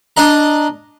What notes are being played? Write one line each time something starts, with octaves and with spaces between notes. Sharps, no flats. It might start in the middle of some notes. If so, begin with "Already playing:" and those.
D4 D#5 A#5